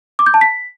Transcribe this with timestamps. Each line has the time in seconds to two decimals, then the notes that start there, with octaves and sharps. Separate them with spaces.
0.19 D6
0.26 G6
0.34 A5
0.41 B6